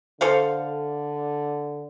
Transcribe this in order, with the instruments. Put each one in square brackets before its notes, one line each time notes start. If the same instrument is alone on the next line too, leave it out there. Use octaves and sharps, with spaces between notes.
[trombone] D3 [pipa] A4 C5 F5